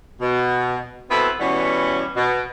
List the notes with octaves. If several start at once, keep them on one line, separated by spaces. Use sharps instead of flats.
B2
B2 B3 C4 E4 A4 B4
B2 E3 G3 B3 C#4
B2